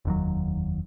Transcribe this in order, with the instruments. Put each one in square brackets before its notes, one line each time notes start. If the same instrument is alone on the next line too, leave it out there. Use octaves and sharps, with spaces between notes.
[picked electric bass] F1 D#2 F#3